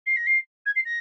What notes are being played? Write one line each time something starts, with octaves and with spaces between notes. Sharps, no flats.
C7
A#6
C7
G#6
C7
A#6